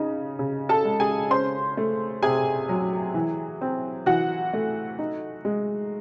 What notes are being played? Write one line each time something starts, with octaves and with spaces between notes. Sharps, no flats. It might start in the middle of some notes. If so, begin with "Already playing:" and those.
Already playing: C#3 D#4
C#3
A4 A5
G#3
G#4 G#5
C#4 C5 C6
A3
C3 G#4 G#5
F#3
E3
C4
E3 F#4 F#5
A3
D#4
G#3